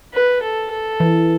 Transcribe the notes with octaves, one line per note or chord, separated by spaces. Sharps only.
B4
A4
A4
E3